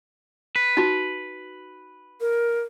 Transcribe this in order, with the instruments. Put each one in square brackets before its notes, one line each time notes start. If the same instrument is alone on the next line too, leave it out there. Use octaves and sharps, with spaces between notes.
[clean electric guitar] B4
[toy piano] D#4 F#4
[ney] A#4